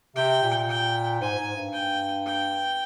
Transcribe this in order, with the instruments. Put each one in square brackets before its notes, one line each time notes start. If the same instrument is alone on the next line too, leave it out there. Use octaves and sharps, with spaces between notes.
[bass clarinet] C3 [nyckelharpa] G5
[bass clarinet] A#2
[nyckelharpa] G5
[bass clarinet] G#2 [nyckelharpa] G#5
[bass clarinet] G#2
G2
[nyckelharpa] G5
G5